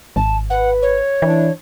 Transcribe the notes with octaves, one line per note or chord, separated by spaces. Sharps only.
G#1 A5
B4 F#5
C#5
E3 D4 E4